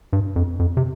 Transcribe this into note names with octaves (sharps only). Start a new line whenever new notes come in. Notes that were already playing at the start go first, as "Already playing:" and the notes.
G2
F2
F2
C3